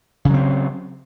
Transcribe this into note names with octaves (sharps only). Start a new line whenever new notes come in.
C#3 F#3 C4